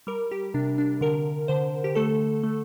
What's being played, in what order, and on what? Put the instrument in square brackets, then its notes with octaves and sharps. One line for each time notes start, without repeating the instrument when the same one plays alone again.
[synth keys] G3 A#4
G4
C3 D4
D4
D3 A#4
D3 C5
G4
A3 A4
A3